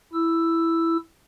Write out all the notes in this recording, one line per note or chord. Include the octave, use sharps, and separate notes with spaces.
E4 E6